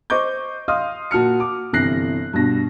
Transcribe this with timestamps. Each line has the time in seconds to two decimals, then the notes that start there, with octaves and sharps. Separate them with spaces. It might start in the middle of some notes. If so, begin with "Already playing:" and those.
0.10 C5 D#5 C#6 D6 G6
0.68 D#5 F5 C6 D#6 F6
1.11 A#2 F#4 A5 F6 C#7
1.40 D6
1.73 G1 C3 E3 F#6 A#6 C7
2.33 G2 B2 A#6